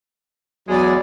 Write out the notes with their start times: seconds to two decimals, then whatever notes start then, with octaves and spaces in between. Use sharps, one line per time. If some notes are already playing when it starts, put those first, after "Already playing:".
0.68 E2 F#3 G#3 D5